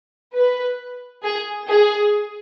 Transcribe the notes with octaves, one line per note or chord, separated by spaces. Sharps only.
B4
G#4
G#4